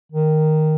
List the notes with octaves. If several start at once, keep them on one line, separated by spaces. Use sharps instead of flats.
D#3